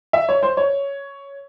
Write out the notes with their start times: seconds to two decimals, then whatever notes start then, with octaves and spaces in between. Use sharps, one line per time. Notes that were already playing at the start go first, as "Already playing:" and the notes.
0.13 E5
0.29 C#5
0.43 C5
0.57 C#5